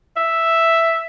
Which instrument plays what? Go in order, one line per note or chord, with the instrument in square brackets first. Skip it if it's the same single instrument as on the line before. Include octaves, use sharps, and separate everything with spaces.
[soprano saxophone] E5